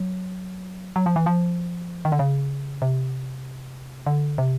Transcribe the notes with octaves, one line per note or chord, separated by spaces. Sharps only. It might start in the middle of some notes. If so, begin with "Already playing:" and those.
Already playing: F#3
F#3
F3
E3
F3
D#3
D3
C#3
C3
D3
C3